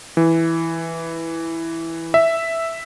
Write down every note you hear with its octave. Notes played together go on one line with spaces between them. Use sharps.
E3
E5